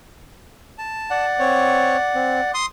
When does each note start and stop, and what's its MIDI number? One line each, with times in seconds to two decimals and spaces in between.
0.78 1.25 81
1.11 2.51 74
1.11 2.51 78
1.39 1.97 60
1.39 1.97 73
2.15 2.40 60
2.54 2.66 84
2.54 2.66 87